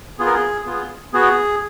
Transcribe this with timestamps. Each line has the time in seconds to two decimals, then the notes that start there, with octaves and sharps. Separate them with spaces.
0.19 B3 F4 G#4
0.26 A#4
0.34 G#4
0.66 B3 F4 G#4
1.13 B3 F#4 G#4